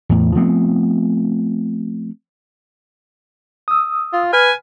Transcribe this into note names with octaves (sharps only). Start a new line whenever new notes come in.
E2 A2
F3 A3 B3 C4
D#6 E6
F4
B4 G#5 F6